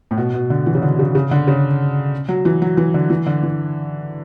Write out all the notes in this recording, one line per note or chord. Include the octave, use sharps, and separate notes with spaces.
A2
B2
B2
D3
E3
C#3
D3
C#3
C#3
D3
C#3
F#3
E3
F#3
E3
D3
E3
D3
E3